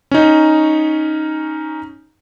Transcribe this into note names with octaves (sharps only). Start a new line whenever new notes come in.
C#4 D#4